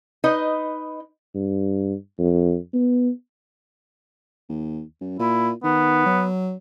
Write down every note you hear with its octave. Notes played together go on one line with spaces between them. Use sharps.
D#4 B4 D#5
G2
F2
B3
D#2
F#2
A#2 E4
D#3 B3
F#3